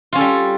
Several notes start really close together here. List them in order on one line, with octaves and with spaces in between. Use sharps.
F4 C#4 A4 G3